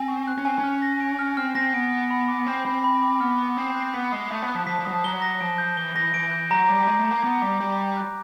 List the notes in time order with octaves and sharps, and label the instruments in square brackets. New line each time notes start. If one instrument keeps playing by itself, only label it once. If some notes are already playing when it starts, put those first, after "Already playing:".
Already playing: [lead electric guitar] C4 [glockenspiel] G#5
[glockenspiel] C#6
F#6
[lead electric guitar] C#4
[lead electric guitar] C4 [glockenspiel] G#5
[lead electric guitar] C#4
[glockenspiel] F6
A#6
D7
F6
[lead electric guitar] C4 [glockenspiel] F6
[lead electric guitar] C4 [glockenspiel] A#6
[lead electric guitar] B3 [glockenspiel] D7
[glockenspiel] F6
B5
D6
[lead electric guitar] C4 [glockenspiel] F6
[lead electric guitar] C4 [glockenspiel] B5
[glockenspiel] B5
D6
[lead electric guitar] B3 [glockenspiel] F6
[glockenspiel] B5
[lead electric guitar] C4 [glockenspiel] D#6
[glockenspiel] F#6
[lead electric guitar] B3 [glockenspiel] B6
[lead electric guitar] G#3 [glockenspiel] D#6
[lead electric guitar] A3 [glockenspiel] D#6
[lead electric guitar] B3
[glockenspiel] F#6
[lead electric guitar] F3
[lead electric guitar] F3 [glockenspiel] B6
[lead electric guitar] F3
[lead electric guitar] F#3 [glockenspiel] D#6
[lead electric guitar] F3
[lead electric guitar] F#3 [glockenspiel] G7
[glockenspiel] A#6
[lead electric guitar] F3 [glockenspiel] D7
[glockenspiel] G6
[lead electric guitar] E3 [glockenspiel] G7
[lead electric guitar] E3 [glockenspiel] A#6
[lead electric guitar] E3 [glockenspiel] D7
[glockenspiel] G6
[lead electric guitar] F#3 [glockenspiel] A#5
[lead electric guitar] G3 [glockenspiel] D6
[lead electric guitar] G#3 [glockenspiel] G6
[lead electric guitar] A3
[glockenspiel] A#5
[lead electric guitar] A#3
[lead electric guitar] B3 [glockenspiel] A#5
[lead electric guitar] G3 [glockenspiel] D6
[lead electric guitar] G3 [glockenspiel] G6
[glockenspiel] A#5
F#6